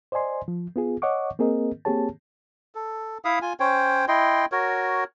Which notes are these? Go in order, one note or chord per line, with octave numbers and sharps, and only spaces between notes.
C5 D5 D#5 G#5 C6
F3
B3 F4 G#4
C#5 D#5 F#5 C#6 D6
A#3 C4 G#4 A#4 D#5
A#3 C4 G4 G#4 C#5 A5
A4
E4 E5 F5 D#6
F4 G#5
C#4 C5 C#5 G5
E4 D#5 G5 C6
F#4 A#4 C#5